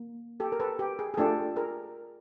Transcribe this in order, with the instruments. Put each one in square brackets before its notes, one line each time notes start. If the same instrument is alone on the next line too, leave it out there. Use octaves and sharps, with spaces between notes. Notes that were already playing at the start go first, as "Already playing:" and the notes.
Already playing: [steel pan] A#3
G4 A4
A#4
A4 B4
G4
G#4
G#4
A3 D4 F4 G4 A4
G#4 A#4